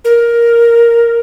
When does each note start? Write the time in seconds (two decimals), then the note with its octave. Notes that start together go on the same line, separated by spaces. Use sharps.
0.05 A#4